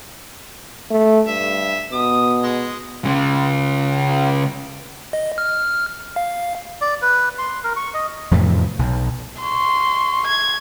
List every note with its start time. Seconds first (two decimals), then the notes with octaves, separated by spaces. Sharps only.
0.91 A3
1.27 G2 E5
1.92 B2 D#6
2.43 G#3
3.05 C#3 G#3
5.13 D#5
5.38 F6
6.16 F5
6.81 D5
7.02 B4
7.38 C6
7.64 A#4
7.76 C#6
7.94 D#5
8.31 F2 A2 C3 E3
8.79 B1
9.42 C6 C#6
10.27 G#6